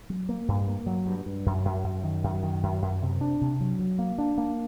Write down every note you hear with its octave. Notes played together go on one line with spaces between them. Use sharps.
F#3
A#3
G2
A#3
F#3
G2
G2
F#2
F#2
F#2
D#3
F#2
D#3
F#2
F#2
C3
D4
C3
F#3
F#3
A#3
D4
A#3